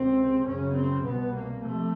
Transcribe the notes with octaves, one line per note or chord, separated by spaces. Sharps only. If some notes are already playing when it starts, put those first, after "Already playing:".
Already playing: C#2 C3 C4
F#2 C#3 C#4
C4
C2 B2 B3
A#3
F2 C3 A3